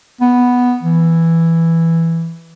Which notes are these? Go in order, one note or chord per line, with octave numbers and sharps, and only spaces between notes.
B3
E3